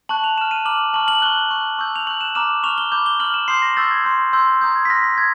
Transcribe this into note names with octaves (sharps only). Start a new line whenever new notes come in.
A5 C#6 F#6 F#7
F7
C#6 F6 E7
D#7
A#5 D6 F6 F#7
A5 C#6 F6 F#7
F#7
C#6 F#6 G7
C#6 F#6
C#6 E6 G6
F7
C#6 F#6 F#7
E7
A#5 D6 F6 E7
C#6 F6 F7
G7
B5 D6 G6
G7
C#6 F6 F#7
E7
C6 D#6 G6 C7
A#6
C#6 E6 G6 A6
G#6
C6 E6 G6
C6 E6 G6
A#5 D#6 G6
G#6
B6
C6 F6 A#6
B6
G6 G#6